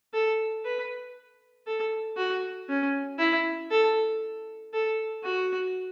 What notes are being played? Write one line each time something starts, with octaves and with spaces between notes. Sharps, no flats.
A4
B4
A4
F#4
C#4
E4
A4
A4
F#4